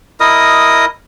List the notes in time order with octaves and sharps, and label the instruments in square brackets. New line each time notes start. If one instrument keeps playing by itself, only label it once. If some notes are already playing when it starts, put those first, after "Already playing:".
[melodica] E4 A#4 D#5 D#6